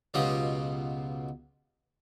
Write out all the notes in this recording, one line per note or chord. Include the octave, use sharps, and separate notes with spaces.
C#2 B2 F#3 F4 G4 D#5